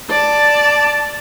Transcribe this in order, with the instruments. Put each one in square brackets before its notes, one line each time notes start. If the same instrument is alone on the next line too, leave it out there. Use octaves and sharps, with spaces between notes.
[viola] D5 A5